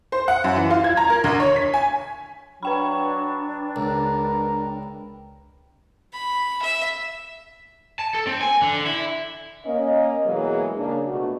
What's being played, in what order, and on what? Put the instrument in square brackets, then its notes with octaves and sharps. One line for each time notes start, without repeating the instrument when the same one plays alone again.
[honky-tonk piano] C5
F#5
F#2
E3
F4
G#6
A#5
A#4
D2
C#5
B6
G#5
[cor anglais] F#3 [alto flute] D4 [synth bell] B4 G5 B5
[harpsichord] C#2 [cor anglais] A#4
[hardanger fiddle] B5
E5
[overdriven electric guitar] A5
A4
C4
G#5
D3
E4
[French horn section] A#3 C#4 D#5
B2 E3 F#3 G#3 A#3 G#4
C#3 A#3 D4
B2 A3 D4 F4 F#4